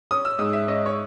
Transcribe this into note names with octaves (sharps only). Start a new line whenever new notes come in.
C#4 D#6
E6
G#2 D#6
E5
C#4 D#5
C#5